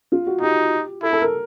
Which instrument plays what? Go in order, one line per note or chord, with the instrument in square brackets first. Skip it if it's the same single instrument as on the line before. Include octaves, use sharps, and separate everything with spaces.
[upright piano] F4
F#4
[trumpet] D#4 [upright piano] G4
[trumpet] E4 [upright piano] A4
[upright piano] A4
A#4